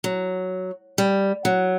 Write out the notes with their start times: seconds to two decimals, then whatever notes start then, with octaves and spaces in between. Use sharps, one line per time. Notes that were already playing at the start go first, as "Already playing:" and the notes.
0.04 F#3
0.98 G3
1.45 F#3